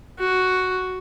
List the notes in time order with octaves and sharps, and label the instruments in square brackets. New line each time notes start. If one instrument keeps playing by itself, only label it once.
[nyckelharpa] F#4